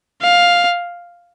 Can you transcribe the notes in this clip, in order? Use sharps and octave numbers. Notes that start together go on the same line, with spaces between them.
F5